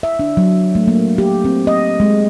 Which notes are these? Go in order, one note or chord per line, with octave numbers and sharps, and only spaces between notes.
E5
D4
F#3
A3
A#3
G4
C4
D#5
G#3